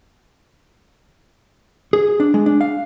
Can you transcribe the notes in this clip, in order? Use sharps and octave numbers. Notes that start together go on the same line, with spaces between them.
G#4
D4
G#3
D4
F5